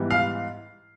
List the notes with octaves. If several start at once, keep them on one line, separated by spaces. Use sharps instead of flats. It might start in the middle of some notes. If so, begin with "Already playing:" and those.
Already playing: G#2 E3 G3 B3
F5